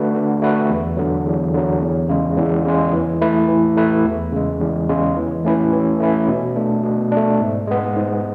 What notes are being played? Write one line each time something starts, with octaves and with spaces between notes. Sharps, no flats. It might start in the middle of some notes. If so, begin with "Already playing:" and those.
Already playing: D3 A3 D4 F#4 B4
D3
A3 D4 F#4 B4
E2
D3 F#3
E2
D3 F#3
E2
C#3 G#3
E2
C#3 G#3
E3
A3 E4 B4
E3
A3 E4 B4
E2
C#3 G#3
E2
C#3 G#3
E3
A3 C#4 E4 B4
E3
A3 C#4 E4 B4
B2
A3 D4
B2
A3 D4
G#2
G#3 B3
G#2